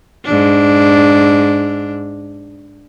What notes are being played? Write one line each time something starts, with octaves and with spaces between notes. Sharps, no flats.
G#2 D4